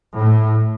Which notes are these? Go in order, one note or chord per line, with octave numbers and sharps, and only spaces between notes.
A2